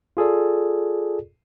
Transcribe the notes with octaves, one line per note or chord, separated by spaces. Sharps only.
F4 G#4 A4 D5